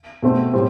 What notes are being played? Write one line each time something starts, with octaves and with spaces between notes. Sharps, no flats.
B2 A3 C4
A2 G3 C4